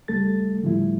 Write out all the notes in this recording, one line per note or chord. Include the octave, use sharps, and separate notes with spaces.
C#2 G3 A3 A4 A6
A2 D3 F3 G3 A3 E4